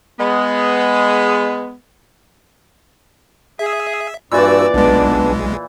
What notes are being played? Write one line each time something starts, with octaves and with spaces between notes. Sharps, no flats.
G#3 B3
G#4 E5
G2 A#2 E3 F#4 D5 E6
B1 G#3 B3 D4